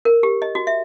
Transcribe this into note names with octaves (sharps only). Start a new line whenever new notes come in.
A#4
G4
D#5
F#4
E5